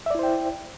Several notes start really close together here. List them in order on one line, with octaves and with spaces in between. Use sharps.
E5 D5 E4 C5 G5